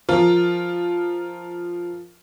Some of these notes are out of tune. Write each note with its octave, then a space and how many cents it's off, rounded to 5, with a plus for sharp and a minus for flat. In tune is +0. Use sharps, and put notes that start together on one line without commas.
F3 +0 F4 +0 A#4 -5